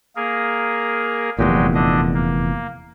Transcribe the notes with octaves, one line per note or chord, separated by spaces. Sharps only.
A#3 G#4 A#4
F1 E2 A#2 F#3 G#3 G4
D3 D4 D#5
A#3